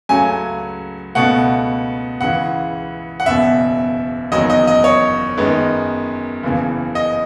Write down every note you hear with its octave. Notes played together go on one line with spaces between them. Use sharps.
C#2 C#3 F#3 A3 G#5
C#2 B2 A3 F#5
C#2 C#3 E3 F#5
F#5
F#1 E2 B2 E5
F#1 E2 D#3 F#3 D#5
D#5
D#5
C#5
F#2 D#3 G#3 B3
F#1 E2 C#3 E3
D#5